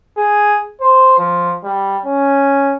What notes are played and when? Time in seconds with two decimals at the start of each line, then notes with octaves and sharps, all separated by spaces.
0.18 G#4
0.81 C5
1.18 F3
1.64 G3
2.05 C#4